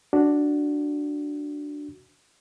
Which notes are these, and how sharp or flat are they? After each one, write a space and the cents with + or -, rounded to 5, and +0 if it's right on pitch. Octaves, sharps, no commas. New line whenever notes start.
D4 +0 F#4 +0